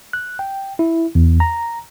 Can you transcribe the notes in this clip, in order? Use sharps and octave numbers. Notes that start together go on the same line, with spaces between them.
F#6
G5
E4
E2
A#5